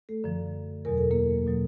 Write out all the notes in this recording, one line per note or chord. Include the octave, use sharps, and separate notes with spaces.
A3 A4
F#2 D3 F3
E2 B2 F#3 A#4
A4
A#3 A#4
B2 F#3